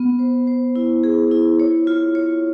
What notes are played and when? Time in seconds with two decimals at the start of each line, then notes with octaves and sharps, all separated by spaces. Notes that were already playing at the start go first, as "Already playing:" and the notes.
Already playing: B3
0.19 C5
0.47 C5
0.76 E4
1.04 G#4
1.32 E4
1.60 C#5
1.87 F4
2.15 C#5